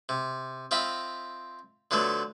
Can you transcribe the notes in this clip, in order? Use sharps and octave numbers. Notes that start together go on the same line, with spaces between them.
C3
C4 F4 D#5 E5 B5
D3 F3 F#3 A3 B3